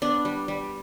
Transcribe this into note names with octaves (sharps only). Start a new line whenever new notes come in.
B3 D4
G3
G3